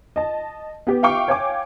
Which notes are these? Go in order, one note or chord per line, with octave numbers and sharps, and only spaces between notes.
D#5 A5
B3 G4
E5 F5 G5 C#6 D6
C#5 F5 G5 G#5 D6